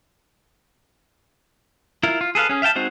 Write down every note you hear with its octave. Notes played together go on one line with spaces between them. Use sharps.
E4 F4 A#4
F4
G#4 A4 B4 F5
C#4 G#4
E5 F5 G5 A5
G#3 C4 D#4 F#4 C5